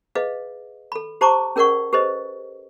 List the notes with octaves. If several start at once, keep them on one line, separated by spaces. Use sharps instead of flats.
G#4 B4 D#5 F5
A4 B5
G4 C5 A5 A#5 C#6 D6
C#4 G#4 A#4 D5 F#5 C#6
G4 A4 B4 C5 D#5